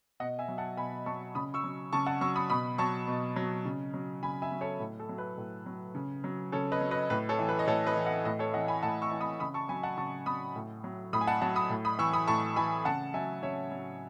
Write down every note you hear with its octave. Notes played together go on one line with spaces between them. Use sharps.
B2 D#5 F#5
E5 G#5
F#3
F#5 A5
B2 G#5 B5
F#3 A5 C#6
C#3 B5 D#6
C#6 E6
F#3
C#3 A5 C#6
F#5 A5
F#3 C#6 E6
B5 D#6
B2 B5 D#6
F#3 A5 C#6
B2
F#3
C#3
F#3
C#3 G#5 B5
E5 G#5
F#3
A4 C#5
A2
A4
F#3
B4
A2
F#3
C#3
F#3
C#3 A4 C#5
B4 D#5
F#3
B4 D#5
A2 B4
A4 C#5
E3
B4
D#5
A2 A4 C#5
B4 D#5
E3
D#5 F#5
A2 B4 D#5
A4 C#5
E3 D#5 F#5
G#5 B5
A2 F#5 A5
C#6 E6
E3
B5 D#6
C#3 B5 D#6
A5 C#6
F#3 G#5 B5
F#5 A5
C#3 A5 C#6
F#3 B5 D#6
A2
F#3
A2 B5 D#6
G#5
F#5 A5
F#3 F#5 A5
B5 D#6
A2
B5 D#6
E3 C#6 E6
B5 D#6
A2 A5 C#6
E3 G#5 B5
C#3 F#5 A5
F#3 E5 G#5
C#3 C#5 E5
F#3